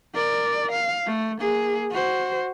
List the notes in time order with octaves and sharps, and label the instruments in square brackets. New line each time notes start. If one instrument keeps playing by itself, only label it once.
[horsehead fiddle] A#4 D5
F5
A3
A#3 G#4
F#4 C5